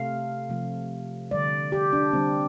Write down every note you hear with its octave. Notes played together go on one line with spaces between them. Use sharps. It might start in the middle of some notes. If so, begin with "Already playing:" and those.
Already playing: C3 A3 F5
C3 F3 A3
D3 G3 D5
G4
D4
D3 G3 C4